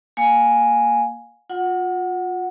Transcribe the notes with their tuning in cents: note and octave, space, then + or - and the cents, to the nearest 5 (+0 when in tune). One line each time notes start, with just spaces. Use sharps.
A#3 +0 F5 +30 G#5 +0
F4 +30 F#5 +0